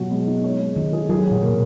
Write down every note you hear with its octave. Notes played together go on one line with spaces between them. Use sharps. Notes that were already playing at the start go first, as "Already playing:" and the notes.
Already playing: B2 F#3 F#4
G#3
D#4
C#5
G#3
D#3 D#4
G#4
F#3 G#4
F#3
A#2
B2 A#3